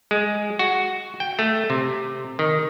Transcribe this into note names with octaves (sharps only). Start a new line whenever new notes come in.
G#3
F#4
G5
A3
C3
D#3